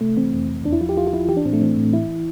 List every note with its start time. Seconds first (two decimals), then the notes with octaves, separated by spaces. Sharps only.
0.01 C3 A3
0.17 E3 C4
0.33 F2
0.49 F2
0.64 E2 D4
0.73 E4
0.81 F3 F4
0.89 G4
0.96 E2 F4
1.07 F4
1.13 F3 E4
1.29 E3 G4
1.37 D4
1.45 A2 C4
1.53 A3
1.61 E3 C4
1.77 A2
1.93 E3 E4